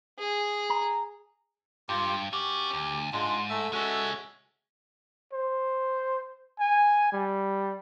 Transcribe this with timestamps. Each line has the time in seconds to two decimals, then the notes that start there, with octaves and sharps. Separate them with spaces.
0.19 G#4
0.70 A#5
1.89 G2 F4 G4 G5
2.33 C#4 F#4 G4
2.73 D2
3.13 G#2 G#3 D4 F4
3.50 A3 E5 E6
3.73 G#3 C#4 F#4 A4 E5
5.33 C5
6.60 G#5
7.13 G3